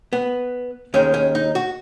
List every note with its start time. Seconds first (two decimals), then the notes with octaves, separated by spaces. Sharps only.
0.13 B3
0.94 D#2 D#3 G#3 C#4
1.14 C#4
1.35 D#4
1.55 F#4